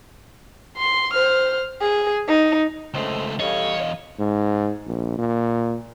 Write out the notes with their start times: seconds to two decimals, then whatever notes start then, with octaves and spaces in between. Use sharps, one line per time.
0.77 C6
1.13 C5 F6
1.81 G#4
2.28 D#4
2.94 C#2 A3 C#4 C5 D#5
3.40 E2 G3 C#4 A4 C#5 D#5 F5
4.20 G#2
4.87 A#1
5.18 A#2